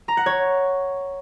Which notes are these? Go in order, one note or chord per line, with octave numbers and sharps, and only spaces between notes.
A#5
F#5
C#5